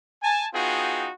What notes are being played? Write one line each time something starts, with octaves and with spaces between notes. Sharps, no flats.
G#5 A5
B3 D#4 F4 F#4 G#4 G5